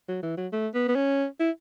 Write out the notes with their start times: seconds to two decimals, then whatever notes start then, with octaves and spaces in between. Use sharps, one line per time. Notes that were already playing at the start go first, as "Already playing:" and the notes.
0.08 F#3
0.23 E3
0.37 F#3
0.52 A3
0.74 B3
0.88 B3
0.95 C#4
1.40 E4